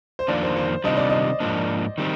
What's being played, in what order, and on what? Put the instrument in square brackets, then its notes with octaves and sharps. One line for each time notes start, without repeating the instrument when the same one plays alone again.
[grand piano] C5
[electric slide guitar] F2 D#3 A#3 D4 F4 [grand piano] D5
[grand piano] C5
C5
[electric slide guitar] C3 D#3 G3 D4 F4 [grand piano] D#5
[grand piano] D5
D#5
[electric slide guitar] G#2 F3 A#3 D4
D#3 G3 C4